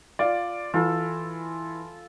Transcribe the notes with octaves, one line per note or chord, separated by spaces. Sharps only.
F4 D5
E3 F4 A4